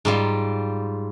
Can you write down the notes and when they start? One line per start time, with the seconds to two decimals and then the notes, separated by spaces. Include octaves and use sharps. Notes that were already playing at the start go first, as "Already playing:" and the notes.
0.05 G#2 G3 F4